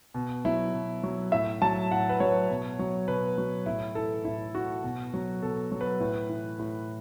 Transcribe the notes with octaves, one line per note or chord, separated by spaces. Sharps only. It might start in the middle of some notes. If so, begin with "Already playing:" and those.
B2
F#3 E4
B2
F#3
A2 E5
F#3 A5
A2 F#5
B4
F#3 C#5
B2
F#3
B2 B4
F#3
A2 E4
E3 A4
A2 E4
E3 F#4
B2
F#3
B2 A4
F#3
B4
A2
E3
A2